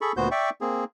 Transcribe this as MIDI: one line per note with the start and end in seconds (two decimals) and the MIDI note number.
0.01 0.12 68
0.01 0.12 69
0.01 0.12 83
0.01 0.12 85
0.17 0.29 38
0.17 0.29 46
0.17 0.29 59
0.17 0.29 66
0.17 0.29 72
0.17 0.29 91
0.31 0.50 74
0.31 0.50 76
0.31 0.50 79
0.31 0.50 85
0.61 0.84 58
0.61 0.84 60
0.61 0.84 68